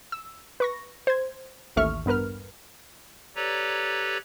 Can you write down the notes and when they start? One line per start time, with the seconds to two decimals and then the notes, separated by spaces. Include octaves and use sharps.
0.12 E6
0.60 B4 C#6 A#6
1.07 C5 G#6
1.76 A1 D#2 A4 E5 C#6 F6
2.06 G2 B3 A#4 B4 F6
3.36 G4 A4 B4 C#5 D5 A#5